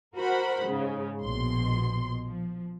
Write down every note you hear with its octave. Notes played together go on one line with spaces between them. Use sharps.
F#4 A#4 C5 F#5 B5
G#2 C#3
A#1 B2 C6
F3